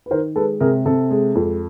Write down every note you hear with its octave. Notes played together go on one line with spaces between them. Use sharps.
B4
D#3 A#4 C5
G#3 A4 B4
C3 G#4 A#4
C3 A4
G#3
F2